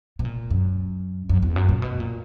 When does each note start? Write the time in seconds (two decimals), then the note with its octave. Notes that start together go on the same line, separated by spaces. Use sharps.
0.19 B2
0.25 A#2
0.50 F#2
1.29 F#2
1.42 E2
1.56 F#2
1.69 A#2
1.82 B2
2.00 A#2